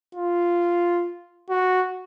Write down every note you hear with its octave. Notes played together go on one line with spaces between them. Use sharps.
F4
F#4